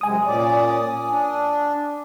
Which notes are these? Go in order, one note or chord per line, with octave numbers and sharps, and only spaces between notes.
F#2 C3 G#3 G#5 D#6
A#2 C#4 D5
D4